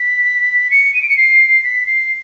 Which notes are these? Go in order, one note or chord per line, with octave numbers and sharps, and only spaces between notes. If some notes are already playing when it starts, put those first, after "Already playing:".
Already playing: B6
C#7
D#7
D7
C#7
C7
B6
C7